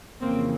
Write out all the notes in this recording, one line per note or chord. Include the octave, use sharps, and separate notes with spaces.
F2 C#3 E3 A#3 C4